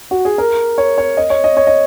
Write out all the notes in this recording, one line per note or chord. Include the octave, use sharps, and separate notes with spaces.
F#4
G#4
A#4
C#5
C#5
D#5
C#5
D#5
C#5
D#5